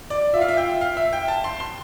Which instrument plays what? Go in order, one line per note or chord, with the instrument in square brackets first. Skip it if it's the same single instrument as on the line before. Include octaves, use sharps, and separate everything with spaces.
[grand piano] D5
[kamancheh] F4 [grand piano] E5
[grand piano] F5
E5
G5
F5
E5
G5
A5
C6
C6